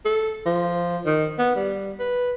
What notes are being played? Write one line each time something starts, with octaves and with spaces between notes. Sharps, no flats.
A4
F3
D#3
B3
G3
B4